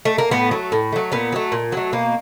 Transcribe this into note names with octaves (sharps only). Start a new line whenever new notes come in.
A3
A#3
A2 B3
F#3 A3
A2
F#3 A3
A#2 B3
F#3 A3
A#2
F#3 A3
B2 A#3